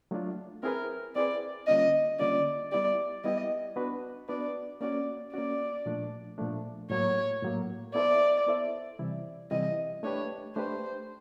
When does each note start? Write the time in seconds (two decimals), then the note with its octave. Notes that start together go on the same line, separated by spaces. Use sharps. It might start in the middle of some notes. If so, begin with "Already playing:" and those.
0.11 F#3 A3 D4 F4
0.63 C4 E4 G#4 A#4 B4
1.15 C4 E4 G#4 B4 D5
1.67 D3 G3 A#3 C#4 F4 D#5
2.19 D3 G3 A#3 C#4 F4 D5
2.72 G3 B3 E4 G4 D5
3.24 G3 B3 E4 G4 D#5
3.76 B3 D4 F#4 B4
4.29 B3 D4 F#4 B4 D5
4.81 A#3 C#4 F#4 D5
5.33 A#3 C#4 F#4 D5
5.86 A#2 F3 A3 D4
6.38 A#2 F3 A3 D4
6.90 A2 F#3 A#3 C#5
7.42 A2 F#3 A#3
7.94 B3 E4 A4 C5 D5 E5
8.47 B3 E4 A4 C5 E5
8.99 C3 E3 G3 C4 E4
9.51 C3 E3 G3 C4 E4 D#5
10.03 A3 D4 G4 B4 C#5
10.56 A3 D4 G4 B4 C5